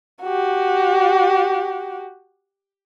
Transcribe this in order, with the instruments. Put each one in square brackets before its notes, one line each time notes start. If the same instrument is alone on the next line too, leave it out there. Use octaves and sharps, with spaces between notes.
[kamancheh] F#4 G4